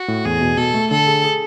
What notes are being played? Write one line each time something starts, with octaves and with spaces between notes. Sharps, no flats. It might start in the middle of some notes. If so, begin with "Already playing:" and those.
Already playing: F#4
A2
E2 G#4
B2
B2 A4
A3
D3 A4
G#4
G#4